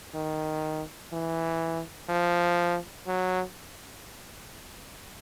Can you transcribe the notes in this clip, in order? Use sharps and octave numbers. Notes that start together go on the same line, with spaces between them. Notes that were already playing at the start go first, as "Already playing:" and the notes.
D#3
E3
F3
F#3